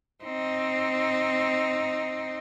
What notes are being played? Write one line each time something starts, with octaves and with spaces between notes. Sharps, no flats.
C4 D#4